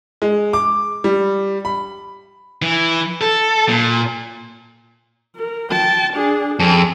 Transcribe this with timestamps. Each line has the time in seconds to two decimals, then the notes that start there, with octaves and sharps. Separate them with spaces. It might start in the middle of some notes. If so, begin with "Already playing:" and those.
0.22 G#3
0.53 D6
1.04 G3
1.65 B5
2.62 E3
3.21 A4
3.69 A#2
5.36 A#4
5.71 G5 A5
6.13 D4 G#4
6.59 F2 G#4